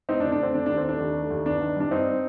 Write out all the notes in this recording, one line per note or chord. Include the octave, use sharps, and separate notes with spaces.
F1 C4 D#4
D4
D3
D4
F1 C4
D3 D4
D#2 D4
C4
A3 D4
D#2
A3
D#2
G1 D4
D#3
G3 D4
G2 C4 D#4